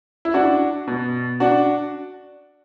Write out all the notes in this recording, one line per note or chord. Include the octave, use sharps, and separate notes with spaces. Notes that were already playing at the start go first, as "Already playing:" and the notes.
E4
D4 F#4
B2
D4 F#4